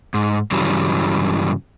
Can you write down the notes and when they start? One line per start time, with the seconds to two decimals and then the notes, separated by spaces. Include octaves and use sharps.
0.14 G#2
0.51 G2 C#3 E3 F#3 G3